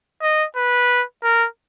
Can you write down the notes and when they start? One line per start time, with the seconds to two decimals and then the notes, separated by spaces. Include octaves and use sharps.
0.22 D#5
0.57 B4
1.23 A#4